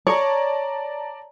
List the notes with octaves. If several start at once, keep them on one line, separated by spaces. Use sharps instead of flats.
C#5 D5 A5 A#5